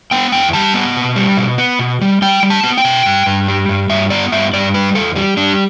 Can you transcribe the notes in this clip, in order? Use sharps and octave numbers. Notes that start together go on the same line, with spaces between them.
B3 G5
E2 G5
G3 A5
B3
B2
G3
B2
B3
B2
G3
G3 G5
G3
A5
B3
G5
B2
G2
G2
G3
G2
G2 E5
B3 D5
G2 E5
G2 D5
G3 B4
E2 A4
G3
G3 D4